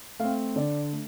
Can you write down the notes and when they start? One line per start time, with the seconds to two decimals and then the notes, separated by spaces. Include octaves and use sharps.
0.19 A3 C4 F5
0.56 D3 D5
0.93 A3